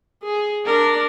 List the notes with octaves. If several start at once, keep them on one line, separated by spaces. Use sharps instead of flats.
G#4
D4 A#4